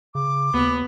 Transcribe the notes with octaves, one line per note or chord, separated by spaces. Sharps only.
C#3 D6
D#2 B3